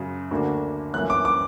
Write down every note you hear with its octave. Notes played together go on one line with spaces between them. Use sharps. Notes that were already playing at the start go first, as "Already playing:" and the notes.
Already playing: F#2 C#3 F#3
D2 D3 A#3 D4 F#4
G1 F#2 E3 A#3 C#4 F#6
D6
D6